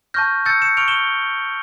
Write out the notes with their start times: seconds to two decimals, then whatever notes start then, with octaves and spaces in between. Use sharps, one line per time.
0.14 A5 C#6 F6 G6 A#6
0.45 A5 E6 G6 A6 C#7
0.62 C#7 E7
0.77 C#6 F6 D7 F7
0.88 E7 G7